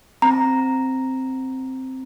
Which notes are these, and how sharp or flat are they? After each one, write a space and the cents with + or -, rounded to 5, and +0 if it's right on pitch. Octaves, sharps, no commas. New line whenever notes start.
C4 +0 A#5 +0